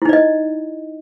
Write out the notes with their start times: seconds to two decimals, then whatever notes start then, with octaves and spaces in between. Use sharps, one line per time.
0.02 E4
0.05 D#4
0.09 D5
0.13 D#5